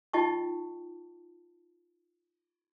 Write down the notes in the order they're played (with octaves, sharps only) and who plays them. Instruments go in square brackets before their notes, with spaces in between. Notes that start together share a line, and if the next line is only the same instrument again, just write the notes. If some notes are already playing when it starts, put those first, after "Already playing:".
[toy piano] D#4 F4 D#5 G5 A5 C#6